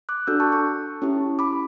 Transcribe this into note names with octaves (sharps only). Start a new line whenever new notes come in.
D6 F#6
D4 F#4 A4 E6 G6
A5 C#6
A5 C#6
C#4 E4 G4
B5 D6